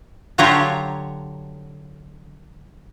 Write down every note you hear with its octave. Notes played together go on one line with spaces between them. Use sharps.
D3 F#3 F4 G4 C#5 A#5